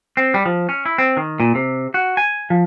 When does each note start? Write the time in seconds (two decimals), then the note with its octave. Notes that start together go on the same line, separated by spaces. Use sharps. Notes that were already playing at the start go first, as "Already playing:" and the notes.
0.17 C4
0.34 G3
0.46 F3
0.69 C#4
0.86 E4
0.98 C4
1.17 D#3
1.40 A#2
1.55 C3
1.94 F#4
2.17 G#5
2.50 F3